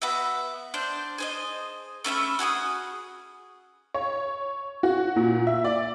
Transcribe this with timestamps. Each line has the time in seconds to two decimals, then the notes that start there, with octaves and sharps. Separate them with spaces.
0.02 B3 F#4 E5
0.74 D4 C5 G6
1.18 G#4 C5 D#5
2.04 A3 C#4 E5 B5
2.39 F#4 G#4 D6 D#6
3.94 C#5
4.83 F#4
5.16 A#2
5.47 E5
5.64 D5